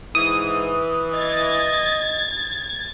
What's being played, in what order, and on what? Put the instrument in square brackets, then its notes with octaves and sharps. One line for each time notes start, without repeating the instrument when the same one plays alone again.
[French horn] G#2 [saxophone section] E3 [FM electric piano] D#6
[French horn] D#5 [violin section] G#6 A6